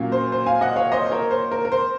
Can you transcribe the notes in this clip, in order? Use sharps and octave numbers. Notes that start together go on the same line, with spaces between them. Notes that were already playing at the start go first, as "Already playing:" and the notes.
Already playing: A#2 F#3 A#3 C#4
C5
C5
F5 G#5
D#5 F#5
C#5 F5
C5 D#5
C5
A#4 C#5
C5
A#4
A#4
C5